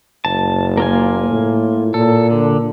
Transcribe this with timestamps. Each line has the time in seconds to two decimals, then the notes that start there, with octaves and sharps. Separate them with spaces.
0.25 F#1 A5
0.77 A#3 F4 G#5
1.29 A2
1.94 A#2 A4
2.30 D3